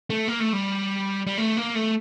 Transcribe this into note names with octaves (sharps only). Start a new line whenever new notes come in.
A3
A#3
A3
G3
G3
A3
A#3
A3